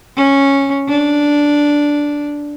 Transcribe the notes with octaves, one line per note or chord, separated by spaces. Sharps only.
C#4
D4